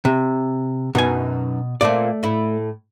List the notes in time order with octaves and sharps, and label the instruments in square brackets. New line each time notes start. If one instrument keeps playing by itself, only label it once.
[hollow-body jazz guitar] C3
[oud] F#2 B3 D#4 [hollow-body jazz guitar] B2 G#5
[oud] A#2 A#3 C4 [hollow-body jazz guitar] A3 D5
[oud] A2 E4